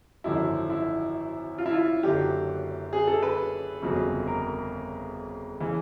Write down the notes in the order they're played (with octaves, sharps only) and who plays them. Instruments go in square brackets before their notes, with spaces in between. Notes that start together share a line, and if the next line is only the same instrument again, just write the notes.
[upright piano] G#1 F#2 D3 F3 E4
E4
F4
E4
F4
F#1 F#2 D3 F#3 G4
G#4
A4
B4
G1 F2 C#3 F#3
A#4
C#3 E3